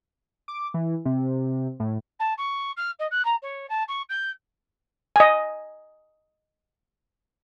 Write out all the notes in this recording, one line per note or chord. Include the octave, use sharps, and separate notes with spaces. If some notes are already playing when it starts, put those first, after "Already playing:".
D6
E3
C3
A2
A5
C#6
F6
D#5
F#6
A#5
C#5
A5
C#6
G6
D#5 G#5